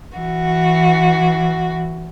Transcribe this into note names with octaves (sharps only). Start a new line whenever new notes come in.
E3 F#4